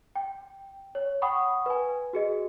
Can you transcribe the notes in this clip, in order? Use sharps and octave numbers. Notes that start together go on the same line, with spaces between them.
G5
C#5
F#5 G5 B5 C#6 D#6
B4 G#5
F#4 G#4 D#5